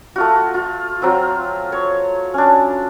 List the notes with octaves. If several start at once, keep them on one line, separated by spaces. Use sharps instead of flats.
A3 F4 F#4
F4
F#3 C4 F4
C#5
C#4 D4